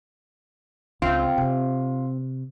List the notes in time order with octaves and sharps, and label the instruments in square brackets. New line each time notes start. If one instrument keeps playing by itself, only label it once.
[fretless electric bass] C#2 [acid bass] C4 [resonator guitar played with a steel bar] F4
[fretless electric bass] C3